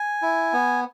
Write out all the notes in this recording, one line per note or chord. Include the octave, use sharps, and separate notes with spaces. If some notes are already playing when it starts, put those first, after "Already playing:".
Already playing: G#5
E4
B3